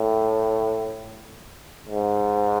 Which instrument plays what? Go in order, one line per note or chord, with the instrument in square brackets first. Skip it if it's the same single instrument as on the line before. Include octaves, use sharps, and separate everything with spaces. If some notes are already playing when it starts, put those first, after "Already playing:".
Already playing: [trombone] A2
G#2